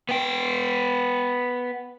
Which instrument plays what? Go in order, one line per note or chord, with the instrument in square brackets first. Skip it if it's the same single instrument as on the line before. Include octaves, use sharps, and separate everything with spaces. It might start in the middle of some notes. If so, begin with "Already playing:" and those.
[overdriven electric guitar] B3 G5